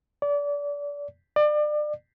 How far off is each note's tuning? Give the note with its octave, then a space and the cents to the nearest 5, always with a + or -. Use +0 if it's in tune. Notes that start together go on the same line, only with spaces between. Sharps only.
D5 -30
D5 +30